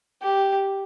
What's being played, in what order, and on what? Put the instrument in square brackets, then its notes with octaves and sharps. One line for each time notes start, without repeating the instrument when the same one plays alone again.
[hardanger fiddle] G4